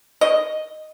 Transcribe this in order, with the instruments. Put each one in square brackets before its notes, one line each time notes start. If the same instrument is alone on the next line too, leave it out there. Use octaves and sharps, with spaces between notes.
[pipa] D#5